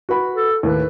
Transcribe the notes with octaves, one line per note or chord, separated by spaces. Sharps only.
F#4 B4 B5
A4
D#2 A2 B4